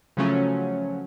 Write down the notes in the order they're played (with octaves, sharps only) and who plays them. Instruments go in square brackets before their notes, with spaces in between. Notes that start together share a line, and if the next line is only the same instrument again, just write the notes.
[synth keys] C#3 F3 F#3 A3 C#4